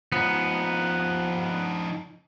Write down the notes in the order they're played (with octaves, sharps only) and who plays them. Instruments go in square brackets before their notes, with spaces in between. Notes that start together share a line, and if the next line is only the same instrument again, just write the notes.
[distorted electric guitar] F3 D#4 [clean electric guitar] B3